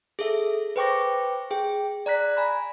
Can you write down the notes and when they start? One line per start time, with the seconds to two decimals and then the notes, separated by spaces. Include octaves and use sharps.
0.19 G#4 A4 E5
0.76 B4 C5 G5 C#6 D6 A#6
1.51 G#4 G5
2.06 D5 A#5 F#6 B6
2.37 G#5 A#5 B5